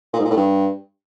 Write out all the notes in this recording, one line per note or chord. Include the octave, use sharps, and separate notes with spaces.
A#2
G#2
A#2
A2
G2